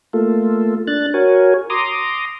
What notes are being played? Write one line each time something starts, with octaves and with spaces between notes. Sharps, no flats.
A3 A#3 F4 A4
D4 F#6 A6
F#4 A#4 C#5 G#5
A#5 C6 D6 D#6